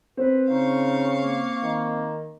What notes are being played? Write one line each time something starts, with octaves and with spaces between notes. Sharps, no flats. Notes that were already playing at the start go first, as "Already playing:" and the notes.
C4 B4
C#3 D#4 F5 C#6
A#3
D#3